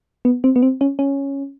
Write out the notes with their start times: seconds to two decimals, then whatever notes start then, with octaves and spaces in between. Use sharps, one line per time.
0.25 B3
0.44 C4
0.56 B3
0.62 C4
0.81 C#4
0.99 C#4